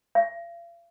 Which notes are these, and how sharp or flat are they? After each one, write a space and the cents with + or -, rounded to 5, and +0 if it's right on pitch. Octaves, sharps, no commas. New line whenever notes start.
F5 -40